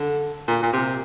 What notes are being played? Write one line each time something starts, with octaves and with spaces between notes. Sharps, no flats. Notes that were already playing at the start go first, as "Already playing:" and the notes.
Already playing: D3
A#2
A#2
C3